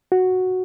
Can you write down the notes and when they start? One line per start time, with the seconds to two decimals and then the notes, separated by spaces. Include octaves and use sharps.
0.12 F#4